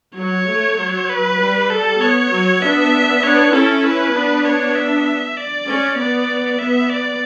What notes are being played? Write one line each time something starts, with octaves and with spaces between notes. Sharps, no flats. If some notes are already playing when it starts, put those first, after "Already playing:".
F#3 C#5
A3
F#3
B4
G3
A4
B3 C#5
F#3
B3 D4 E5
B3 D4 C#5
C#4 E4 A4
B4
B3 D4
C#5
E5
D5
C#4
B3 D5
B3 E5
D5